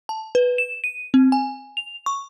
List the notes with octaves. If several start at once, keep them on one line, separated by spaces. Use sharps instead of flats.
A5
B4
E7
D#7
C4
G#5
F7
C#6